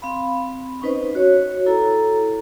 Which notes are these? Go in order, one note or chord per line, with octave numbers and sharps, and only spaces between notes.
C4 F5 B5
C#4 D#4 B4 C5 D#5
F#4 C#5
E4 A4 A#5